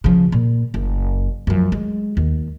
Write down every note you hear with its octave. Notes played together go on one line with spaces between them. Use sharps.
C#3 F3
A#2
F#1
F#2 F3
G#3
D#2